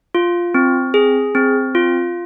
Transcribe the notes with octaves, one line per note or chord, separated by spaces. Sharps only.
F4
C4
G#4
C4
F4